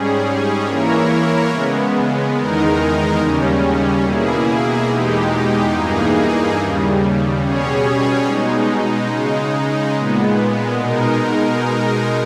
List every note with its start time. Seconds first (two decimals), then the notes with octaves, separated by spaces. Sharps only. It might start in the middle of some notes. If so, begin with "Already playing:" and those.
Already playing: G#2 G3 C#4 G#4
0.65 E3 A#3 E4 A#4 C#5
1.50 C#3 G#3 B3
2.35 E2 D#3 G#3 D#4 A#4
3.19 D#2 C#3 G3 C#4
4.04 B2 A#3 E4 G#4
4.88 E2 B2 G#3 D#4 G4
5.72 G2 E3 A#3 D#4 G#4
6.56 D#2 C#3 G3
7.41 B2 G3 C#4 G#4 C#5
8.25 B2 G#3 D#4
9.10 C#3 G#3 D#4
9.94 A#2 G#3 B3
10.78 B2 G#3 D#4 A#4